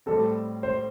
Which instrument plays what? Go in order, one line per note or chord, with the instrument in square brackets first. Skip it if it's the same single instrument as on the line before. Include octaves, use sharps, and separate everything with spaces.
[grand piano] A2 G3 C4 [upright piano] A4
[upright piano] C5